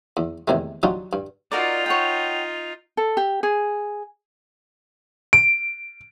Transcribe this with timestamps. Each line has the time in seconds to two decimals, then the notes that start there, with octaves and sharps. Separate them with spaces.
0.17 E2
0.48 E2 A2 C3 D#3 G#3
0.83 F#3 G3 D4 D#4 F4
1.13 G2
1.52 D#4 F4 F#4 A#4 D5
1.86 C#5 F#5 G5
2.97 A4
3.17 G4
3.43 G#4
5.33 D7